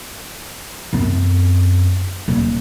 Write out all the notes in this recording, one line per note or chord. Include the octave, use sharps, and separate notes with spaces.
F#2 C4
D#1